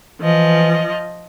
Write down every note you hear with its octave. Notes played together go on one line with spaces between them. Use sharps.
E3 F3 D#5